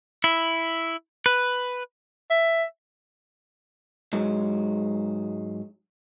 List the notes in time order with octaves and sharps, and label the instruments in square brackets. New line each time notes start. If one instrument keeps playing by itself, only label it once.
[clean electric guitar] E4
B4
[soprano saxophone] E5
[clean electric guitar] G#2 F#3 G#3